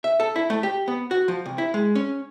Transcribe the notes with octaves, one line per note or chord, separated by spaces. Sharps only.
E5
A4
E4
A3
G4
B3
F#4
F3
C2
E4
G#3
C#4